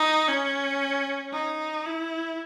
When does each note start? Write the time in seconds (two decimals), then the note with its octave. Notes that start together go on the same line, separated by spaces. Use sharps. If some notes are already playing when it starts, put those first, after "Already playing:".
Already playing: D#4
0.28 C#4
1.33 D#4
1.86 E4